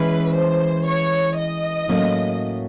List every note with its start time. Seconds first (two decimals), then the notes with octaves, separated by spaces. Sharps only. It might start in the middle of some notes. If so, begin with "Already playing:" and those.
Already playing: E3 G#3 C#4 E4 B4
0.35 C5
0.86 C#5
1.37 D#5
1.88 A2 F#3 A#3 C#4